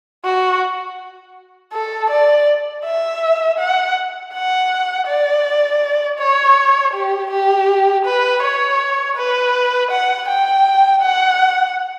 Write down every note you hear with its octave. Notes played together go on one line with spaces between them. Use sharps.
F#4
A4
D5
E5
F#5
F#5
D5
C#5
G4
G4
B4
C#5
B4
F#5
G5
F#5